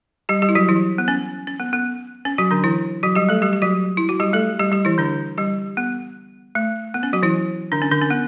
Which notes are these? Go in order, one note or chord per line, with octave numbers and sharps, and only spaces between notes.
G3 G4
G3 G4
E4
F#3 F#4
E3 E4
B3
C#4
C#4
B3
B3
C#4
F#3 F#4
D3 D4
E3 E4
F#3 F#4
G3 G4
A3 A4
G3 G4
G4
F#3 F#4
E4
F#4
G3 G4
A3 A4
G3 G4
G3 G4
E3 E4
D3 D4
G3 G4
B3
A3
B3
C#4
F#3 F#4
E3 E4
D3 D4
C#4
D3 D4
C#4
B3